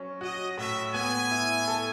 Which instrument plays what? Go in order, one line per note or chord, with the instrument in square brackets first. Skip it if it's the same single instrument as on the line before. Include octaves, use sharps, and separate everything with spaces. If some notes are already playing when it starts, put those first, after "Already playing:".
Already playing: [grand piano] F#3 C#4
[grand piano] F#4 [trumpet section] D#5
[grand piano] A2 [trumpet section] E5
[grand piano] B3 [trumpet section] G#5
[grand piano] E4
A4